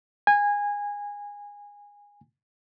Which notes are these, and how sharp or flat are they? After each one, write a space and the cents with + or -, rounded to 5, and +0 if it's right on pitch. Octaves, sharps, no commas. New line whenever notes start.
G#5 -20